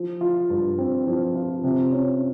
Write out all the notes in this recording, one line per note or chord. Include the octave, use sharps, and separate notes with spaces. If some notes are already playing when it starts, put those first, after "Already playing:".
Already playing: F3
F4
G2
C4
F3
F4
C3
C#4